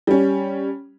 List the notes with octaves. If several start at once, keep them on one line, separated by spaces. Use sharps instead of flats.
G3 C#4